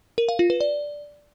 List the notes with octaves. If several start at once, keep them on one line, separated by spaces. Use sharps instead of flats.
A#4
F5
F4
B4
D5